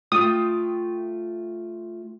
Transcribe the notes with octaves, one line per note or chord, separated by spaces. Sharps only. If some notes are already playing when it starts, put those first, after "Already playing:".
A3 F4 G5 D#6